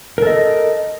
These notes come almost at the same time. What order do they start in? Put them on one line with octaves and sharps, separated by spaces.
A#4 A4 D#5